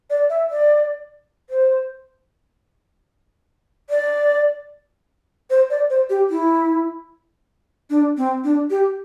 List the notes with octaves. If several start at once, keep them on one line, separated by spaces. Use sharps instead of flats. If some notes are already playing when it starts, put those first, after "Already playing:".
D5
E5
D5
C5
D5
C5
D5
C5
G4
E4
D4
C4
D4
G4